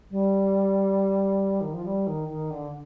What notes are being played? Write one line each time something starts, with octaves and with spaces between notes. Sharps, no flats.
G3
D#3
F3
G3
D#3
D#3
D3